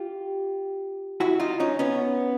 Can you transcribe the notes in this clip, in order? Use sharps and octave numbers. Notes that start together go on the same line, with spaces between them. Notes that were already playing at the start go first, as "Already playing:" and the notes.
Already playing: F4 G4
E4 F#4
D#4 F4
C#4 D#4
B3 C#4